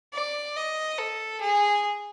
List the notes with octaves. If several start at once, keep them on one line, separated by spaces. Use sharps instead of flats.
D5
D#5
A4
G#4